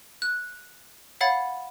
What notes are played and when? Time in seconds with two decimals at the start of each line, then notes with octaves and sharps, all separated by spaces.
0.22 F#6
1.21 C#5 F5 F#5 B5 A6